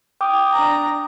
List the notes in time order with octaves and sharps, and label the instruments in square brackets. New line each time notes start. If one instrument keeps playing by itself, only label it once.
[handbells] G5 D6 D#6
[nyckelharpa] D4 A#5